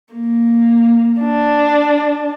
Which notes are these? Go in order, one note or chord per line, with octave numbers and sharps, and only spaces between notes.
A#3
D4